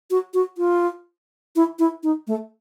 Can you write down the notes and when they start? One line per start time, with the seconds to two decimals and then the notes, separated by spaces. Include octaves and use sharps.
0.11 F#4
0.34 F#4
0.58 F4
1.56 E4
1.79 E4
2.03 D#4
2.27 A3